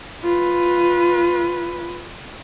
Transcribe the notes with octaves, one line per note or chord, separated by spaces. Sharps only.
F4 B4